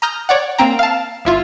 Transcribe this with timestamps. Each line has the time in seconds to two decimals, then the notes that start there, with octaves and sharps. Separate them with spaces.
0.02 A#5 D#6 F6 G6 A#6
0.29 C#5 D5 F#5
0.58 A#3 C4 G5 A#5
0.79 F5 A5
1.25 G1 E4 F4